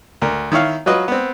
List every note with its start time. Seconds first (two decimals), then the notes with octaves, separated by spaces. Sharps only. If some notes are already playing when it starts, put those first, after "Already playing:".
0.22 D2 A#4
0.52 D#3 E4 C#5 F5
0.86 F#3 F4 F#4 B4 D#5
1.08 B3 C4